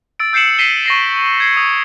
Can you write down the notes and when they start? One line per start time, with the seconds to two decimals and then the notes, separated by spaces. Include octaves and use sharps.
0.20 E6 A6 D7
0.33 E6 G6 C7 C#7 E7 F#7
0.58 B6 C7 D#7 E7 G7
0.86 C#6 A#6 C7
1.40 G#6 C7 C#7
1.57 D#6